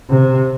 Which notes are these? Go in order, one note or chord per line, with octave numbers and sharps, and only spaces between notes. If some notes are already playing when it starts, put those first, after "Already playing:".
C3